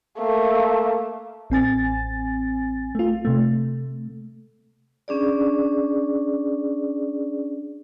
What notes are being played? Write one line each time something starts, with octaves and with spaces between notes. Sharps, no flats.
A3 A#3
A1 C4 G#5 A6
A3 F4
C3 A3
C#4 D4 G#4 D5